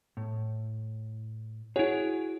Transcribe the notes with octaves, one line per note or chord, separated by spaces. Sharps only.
A2
E4 F#4 G#4 C#5